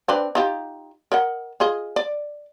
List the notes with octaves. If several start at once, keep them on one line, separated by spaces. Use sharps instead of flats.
C4 D4 B4
D#4 F4 G4
A#4 D#5 F#5
F4 G#4 D#5
D5